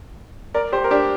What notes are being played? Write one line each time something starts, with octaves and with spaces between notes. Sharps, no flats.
A#4 D5
G4 C5
A#4
D4 G4